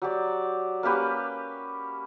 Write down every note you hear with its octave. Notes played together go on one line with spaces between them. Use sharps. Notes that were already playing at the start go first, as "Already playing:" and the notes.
F#3 G4 D5
A#3 C#4 G4 B4